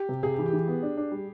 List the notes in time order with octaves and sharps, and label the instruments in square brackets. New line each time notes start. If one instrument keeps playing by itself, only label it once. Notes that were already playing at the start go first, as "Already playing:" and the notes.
Already playing: [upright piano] G4
[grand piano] C3
[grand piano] C3 [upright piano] G#4
[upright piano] G4
[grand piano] E3
[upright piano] G4
[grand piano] E3
B3
D4
D4
G3